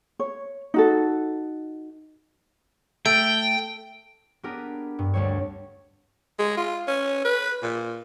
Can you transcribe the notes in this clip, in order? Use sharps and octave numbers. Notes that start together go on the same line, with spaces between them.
C#5
D#4 F#4 A4
A3 G5 D7
B3 D4 G4 G#4 A#4
G2
D2 G3 C4 C#5
G#3
F4
C#4
B4
A#2